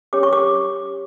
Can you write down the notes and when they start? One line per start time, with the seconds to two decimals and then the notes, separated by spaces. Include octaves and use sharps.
0.13 C#4 G4 C#5 D6
0.23 C#6
0.33 D6